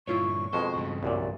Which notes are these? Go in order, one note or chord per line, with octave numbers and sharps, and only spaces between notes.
G2 A#2 D3 E4 F4 C#5 C#6
F2 B2 G#3 C5
C#2 G2 C#3
C2 F#2 A#2 D5